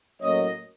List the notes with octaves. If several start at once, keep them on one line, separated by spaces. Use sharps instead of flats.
A2 F#3 A#3 C#4 C#5 D#5